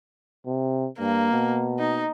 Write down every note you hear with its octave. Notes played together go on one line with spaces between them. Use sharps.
C3
G2 A#3
B2
D#4